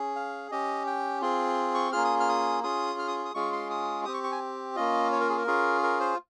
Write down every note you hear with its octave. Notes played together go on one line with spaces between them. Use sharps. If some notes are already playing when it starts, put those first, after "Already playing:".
Already playing: C#4 G#4
F5
C#4 G4 D#5
G5
C4 F4 G#4
C#6
A#3 C#4 F4 G#4 F6
D#6
F6
D#6
C#4 F4 G#4 D#6
F6
D#6
D#6
G#3 C#4 F4 G#4 C#6
C6
D#6
C4 G4 D#6
C#6
C#6
G#5
A#3 C#4 F4 D#5
C#5
A#4
G#4
A#4
C#4 F4 G#4
A#4
C5